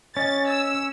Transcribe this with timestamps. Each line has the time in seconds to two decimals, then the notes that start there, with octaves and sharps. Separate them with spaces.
0.17 C#4 C#5 D#5 G#5 A6
0.49 E6